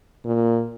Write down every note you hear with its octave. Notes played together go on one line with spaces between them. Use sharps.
A#2